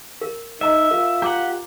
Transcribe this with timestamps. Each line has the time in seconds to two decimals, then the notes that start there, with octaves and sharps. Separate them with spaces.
0.21 A#4
0.61 D#4 D#5 E5 A#5 E6
0.91 F4 A#4
1.22 G4 F#5 A#5 D6